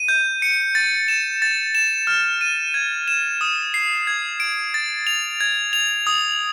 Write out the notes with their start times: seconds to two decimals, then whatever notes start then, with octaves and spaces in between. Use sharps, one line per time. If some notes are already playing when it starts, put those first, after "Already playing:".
Already playing: D#7
0.08 G6
0.42 C#7
0.75 A6
1.08 E7
1.42 A6
1.75 E7
2.07 F6
2.41 D#7
2.74 G#6
3.08 E7
3.41 D#6
3.74 C7
4.07 G#6
4.40 D7
4.74 A6
5.07 F7
5.40 G#6
5.73 F7
6.07 D#6